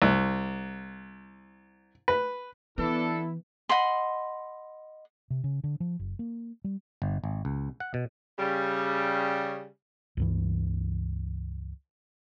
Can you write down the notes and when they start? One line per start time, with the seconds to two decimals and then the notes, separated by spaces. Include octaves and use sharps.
0.02 C2
2.08 B4
2.78 E3 B3 D4 E4 A4
3.69 D#5 F#5 B5 C6
5.30 C3
5.44 C#3
5.64 D3
5.80 F3
5.99 F#1
6.19 A#3
6.64 G3
7.02 G1
7.24 G#1
7.45 C#2
7.80 F#5
7.94 B2
8.38 C#3 G3
10.17 C#2 G2 E3